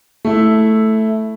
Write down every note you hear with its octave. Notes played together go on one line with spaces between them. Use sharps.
A3 E4